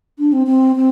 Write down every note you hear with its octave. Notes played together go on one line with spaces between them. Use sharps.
D4
C4
C4
C4